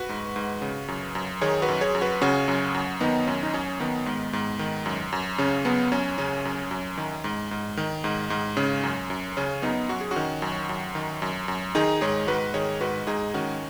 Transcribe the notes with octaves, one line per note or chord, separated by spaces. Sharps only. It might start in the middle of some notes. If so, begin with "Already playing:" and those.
Already playing: F#4 B4
G#2
G#2
C#3
F#2
F#2
D#3 G#4 C#5
F#4 B4
F#2
G#4 C#5
F#2
F#4 B4
C#3 C#4 F#4
F#2
F#2
D#3 B3 D#4
F#2 C#4
D#4
F#2 C#4
D#3 B3
G#2
G#2
D#3
F#2
F#2
C#3 C#4
F#2 B3
F#2 C#4
C#3 C#4
F#2
F#2
D#3
G#2
G#2
D#3
G#2
G#2
C#3 C#4
F#2
F#2
C#3 C#4
F#2 B3 D#4
F#2 F#4
G#4
C#4 F#4
D#3
F#2
F#2
D#3
F#2
F#2
D#3 D#4 G#4
G#2 G#4 C#5
G#2 F#4 B4
D#3 G#4 C#5
G#2 F#4 B4
G#2 D#4 G#4
D#3 C#4 F#4